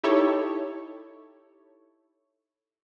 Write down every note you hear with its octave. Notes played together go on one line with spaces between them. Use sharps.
D#4 E4 G4 A4 C#5